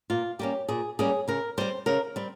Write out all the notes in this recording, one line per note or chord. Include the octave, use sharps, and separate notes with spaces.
A#2 F4
G3 A#3 C#4 G4
A#2 G#4
G3 A#3 C#4 G#4
C#3 A#4
G3 C4 C5
C#3 A#4
G3 C4